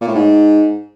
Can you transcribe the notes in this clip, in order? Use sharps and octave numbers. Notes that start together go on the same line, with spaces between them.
A#2
A2
G#2